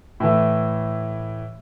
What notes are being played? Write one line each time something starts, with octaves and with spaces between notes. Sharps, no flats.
A2 E3 A3